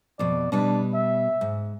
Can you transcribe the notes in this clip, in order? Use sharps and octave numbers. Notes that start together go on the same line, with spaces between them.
F2 B2 D5
B2 G3 D4 B4
E5
G#2